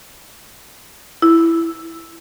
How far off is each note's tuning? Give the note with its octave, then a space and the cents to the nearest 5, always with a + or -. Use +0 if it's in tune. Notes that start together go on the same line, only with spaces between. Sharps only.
E4 +5